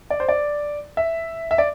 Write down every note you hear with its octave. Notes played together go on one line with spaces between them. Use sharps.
D5
C5
D5
E5
E5
D5